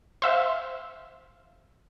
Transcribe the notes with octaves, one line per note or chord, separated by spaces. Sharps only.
C5 E5 F5